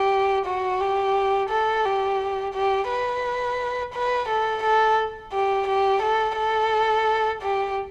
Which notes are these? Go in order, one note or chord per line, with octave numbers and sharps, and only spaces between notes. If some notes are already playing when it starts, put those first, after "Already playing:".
Already playing: G4
F#4
G4
A4
G4
G4
B4
B4
A4
A4
G4
G4
A4
A4
G4